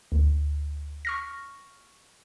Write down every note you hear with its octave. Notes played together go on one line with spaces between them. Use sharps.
D2
C#6 F6 A#6